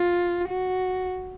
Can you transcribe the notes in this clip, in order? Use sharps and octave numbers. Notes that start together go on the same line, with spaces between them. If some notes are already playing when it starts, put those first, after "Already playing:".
Already playing: F4
F#4